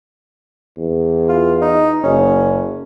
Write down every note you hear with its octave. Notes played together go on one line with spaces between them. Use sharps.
E2
F4
D#4
F#1 C#4